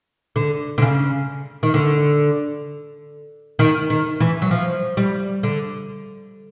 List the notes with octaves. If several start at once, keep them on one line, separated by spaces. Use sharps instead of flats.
D3
D3
C#3
D#3
D3
D#3
D#3
E3
F#3
F3
G3
D3